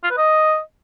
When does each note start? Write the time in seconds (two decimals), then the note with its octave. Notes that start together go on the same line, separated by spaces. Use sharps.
0.04 F4
0.10 B4
0.17 D#5